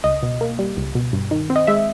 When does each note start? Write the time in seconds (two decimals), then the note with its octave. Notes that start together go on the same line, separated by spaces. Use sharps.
0.04 C#2 D#5
0.23 B2
0.41 A#3
0.59 G3
0.77 C#2
0.95 B2
1.13 G2
1.31 D#3
1.50 C4
1.56 D#5
1.67 G#3 E5